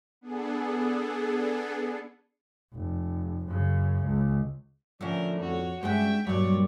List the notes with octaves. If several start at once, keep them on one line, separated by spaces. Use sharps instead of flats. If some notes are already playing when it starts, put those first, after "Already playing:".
B3 D4 G#4 A4
F1
F#2 C#3
C#2
A2 D3 F3 C#4 D4 A#4
F2 F#4 C#5
G2 G#3 C#4 F#4 E5 G5
G2 A#2 F#3 C#5 D5